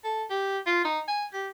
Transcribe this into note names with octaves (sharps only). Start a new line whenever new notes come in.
A4
G4
F4
D#4
G#5
G4